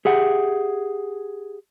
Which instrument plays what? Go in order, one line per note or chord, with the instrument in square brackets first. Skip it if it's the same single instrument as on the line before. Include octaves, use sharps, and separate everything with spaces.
[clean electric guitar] G4 G#4 E5 F#5